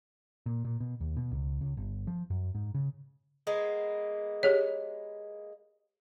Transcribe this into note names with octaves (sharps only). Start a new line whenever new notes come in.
A#2
A#2
B2
D#2
B2
C#2
C#2
G1
F3
F#2
G#2
C#3
G#3 A#3 B3
G4 G#4 C#5